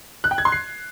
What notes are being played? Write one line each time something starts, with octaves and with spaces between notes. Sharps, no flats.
F#6
G5
G#6
C6
C7